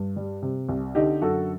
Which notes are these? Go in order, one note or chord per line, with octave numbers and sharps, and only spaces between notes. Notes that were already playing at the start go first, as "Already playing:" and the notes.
Already playing: G2
G3
C3
C2
D3 D#4 G4
F#2 F#4 A4